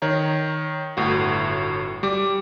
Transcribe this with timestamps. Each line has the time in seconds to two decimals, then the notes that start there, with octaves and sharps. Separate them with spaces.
0.02 D#3 C#5 A#5
0.97 G1 A2 F#4
2.03 G3 D6